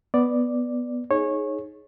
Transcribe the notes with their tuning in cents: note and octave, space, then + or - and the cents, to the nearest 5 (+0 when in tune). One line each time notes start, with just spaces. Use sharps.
B3 +0 D5 +0
D#4 +0 G#4 +15 C#5 -20